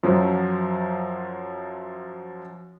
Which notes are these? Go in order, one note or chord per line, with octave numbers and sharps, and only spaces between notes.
F#2 F3 F#3